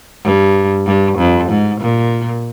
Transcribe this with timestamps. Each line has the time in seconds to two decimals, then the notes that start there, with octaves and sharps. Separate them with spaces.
0.24 G2
0.86 G2
1.18 F2
1.50 G#2
1.81 A#2